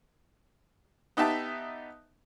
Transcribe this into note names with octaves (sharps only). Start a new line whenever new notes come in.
B3 D#4 G4 E5 A5